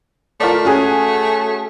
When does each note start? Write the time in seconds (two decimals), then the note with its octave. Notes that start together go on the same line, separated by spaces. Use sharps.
0.40 A3 F4 A#4 D5
0.65 C#4 F#4 G#4